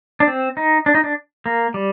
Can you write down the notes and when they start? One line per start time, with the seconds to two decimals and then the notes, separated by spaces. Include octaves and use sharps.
0.20 D4
0.27 C4
0.57 D#4
0.86 D4
0.95 D#4
1.04 D4
1.46 A#3
1.74 G3